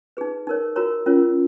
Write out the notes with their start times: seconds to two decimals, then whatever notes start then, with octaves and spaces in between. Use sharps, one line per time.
0.17 D#4 G#4 B4
0.47 D#4 A#4 C#5
0.76 F#4 A#4 C#5 A#5
1.06 C#4 F4 A#4 C#5